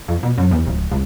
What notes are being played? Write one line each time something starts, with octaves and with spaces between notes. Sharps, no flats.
F2
B2
F#2
E2
D1
C#2